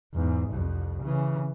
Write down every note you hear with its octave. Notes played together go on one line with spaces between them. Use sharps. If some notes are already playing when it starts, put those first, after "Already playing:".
E2 G#2
C2 F2
C#3 E3